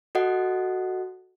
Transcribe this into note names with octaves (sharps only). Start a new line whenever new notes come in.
F#4 A4 D#5 F#5